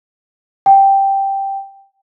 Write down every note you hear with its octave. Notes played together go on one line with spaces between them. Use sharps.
G5